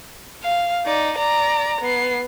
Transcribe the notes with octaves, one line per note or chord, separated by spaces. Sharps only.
F5
D#4 D5
D5 A#5
B3 C7